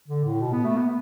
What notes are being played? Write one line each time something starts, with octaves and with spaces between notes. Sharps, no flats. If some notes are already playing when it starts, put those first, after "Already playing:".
D3
A2
B2
B3
A3
B3